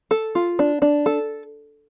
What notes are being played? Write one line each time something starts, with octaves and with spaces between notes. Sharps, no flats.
A4
F4
D4
D4
A4